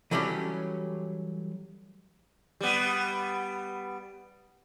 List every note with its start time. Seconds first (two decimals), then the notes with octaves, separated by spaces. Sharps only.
0.11 E3 F#3 G3 A3 C#4 G4
2.61 G3 B3